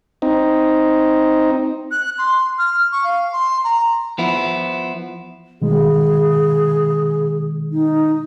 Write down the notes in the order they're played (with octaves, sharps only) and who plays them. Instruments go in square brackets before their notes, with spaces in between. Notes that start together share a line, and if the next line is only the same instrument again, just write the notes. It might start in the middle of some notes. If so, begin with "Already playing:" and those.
[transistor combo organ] C4 D#4
[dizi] F#6
C6
F6
C#6
F5
C6
A#5
[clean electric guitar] F3 B3 E4
[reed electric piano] B2 D#3 G#3 [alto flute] G#4
[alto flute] D#4